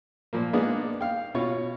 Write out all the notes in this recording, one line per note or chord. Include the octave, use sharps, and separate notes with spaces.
A#2 F3 A#3
G#3 A#3 B3 D4 D#4 G#4
F5 G5
B2 F4 C#5 C#6